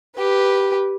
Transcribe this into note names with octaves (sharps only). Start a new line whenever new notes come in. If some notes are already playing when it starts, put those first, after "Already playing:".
G4 B4